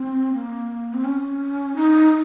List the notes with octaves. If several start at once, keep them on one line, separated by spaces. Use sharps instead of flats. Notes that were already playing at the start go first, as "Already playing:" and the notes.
Already playing: C4
A#3
C4
C#4
D#4